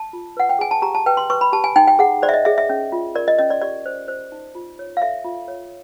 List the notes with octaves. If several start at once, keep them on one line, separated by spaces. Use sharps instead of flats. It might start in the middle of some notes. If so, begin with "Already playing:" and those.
Already playing: A5
F4
B4 F#5
G5
G#4 G#5
A5
G4 A#5
A5
B4 G5
C6
B4 C#6
B5
G4 A5
G#5
D#4 G5
G5
G#4 F#5
C5 D5
E5
D#5
G#4 E5
E5
C#4
F4
A#4 D5
D#5
C#4 D#5
D5
G4 D5
C5
C5
D#4
F4
C#5
F5
A4 E5
F4
C#5